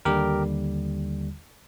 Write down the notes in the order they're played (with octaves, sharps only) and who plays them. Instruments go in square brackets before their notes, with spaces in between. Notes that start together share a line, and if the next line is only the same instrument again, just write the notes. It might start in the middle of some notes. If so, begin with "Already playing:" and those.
[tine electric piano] D#2 D3 G3 G4 A#4